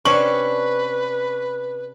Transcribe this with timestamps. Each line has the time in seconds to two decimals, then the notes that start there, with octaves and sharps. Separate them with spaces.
0.05 C3 C#4 D4 B4 C#6 F#7